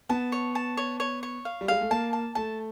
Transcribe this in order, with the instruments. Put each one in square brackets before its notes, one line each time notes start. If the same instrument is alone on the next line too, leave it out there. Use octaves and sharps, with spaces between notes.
[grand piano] B3 [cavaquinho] A5
[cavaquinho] C#5
A5
C#5
C#5
C#5
F5
[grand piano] G3
[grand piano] G#3 [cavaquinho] F5
[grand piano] A3
[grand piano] A#3 [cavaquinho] A5
[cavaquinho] A5
[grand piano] A3 [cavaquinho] A5